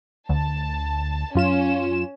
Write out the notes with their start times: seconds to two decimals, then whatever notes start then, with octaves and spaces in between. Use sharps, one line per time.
0.29 D2 A5
1.35 F#2 C#4 F4 E7